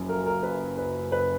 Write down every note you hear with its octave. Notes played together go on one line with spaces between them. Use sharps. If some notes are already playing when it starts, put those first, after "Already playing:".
Already playing: F#1 F#2 C#3 F3
A#4
A#4
B4
B4
B4